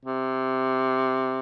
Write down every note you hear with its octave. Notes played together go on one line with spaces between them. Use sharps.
C3